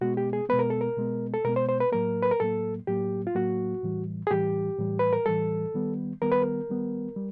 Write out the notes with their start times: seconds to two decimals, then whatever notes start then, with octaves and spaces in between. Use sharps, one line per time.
0.01 B2 G#3 B3 F#4
0.17 G4
0.33 G#4
0.49 B2 G#3 B3 B4
0.59 A#4
0.70 A4
0.81 A#4
0.97 B2 G#3 B3
1.34 A4
1.45 B2 G#3 B3 A#4
1.56 C5
1.69 C5
1.80 B4
1.92 A2 F#3 A#3 A#4
2.23 B4
2.31 A#4
2.40 A2 F#3 A#3 A4
2.87 A2 F#3 A#3 G4
3.27 F4
3.35 A2 F#3 A#3 F#4
3.83 A2 E3 G3
4.27 G#4
4.30 A2 E3 G3 G4
4.78 A2 E3 G3
4.99 B4
5.13 A#4
5.26 A2 E3 G3 A4
5.74 D#3 G3 B3
6.22 D#3 G3 B3 A#4
6.32 B4
6.42 A#4
6.69 D#3 G3 B3
7.16 G3